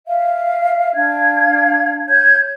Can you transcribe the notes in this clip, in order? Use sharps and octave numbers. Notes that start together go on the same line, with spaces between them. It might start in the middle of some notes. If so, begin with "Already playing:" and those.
E5 F5
D4 F5 G#6
C#5 G6 G#6